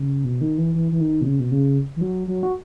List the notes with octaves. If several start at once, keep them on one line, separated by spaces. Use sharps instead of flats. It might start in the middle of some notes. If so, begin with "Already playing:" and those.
Already playing: C#3
B2
D#3
E3
E3
E3
D#3
B2
C#3
B2
C#3
E3
F#3
F#3
F#4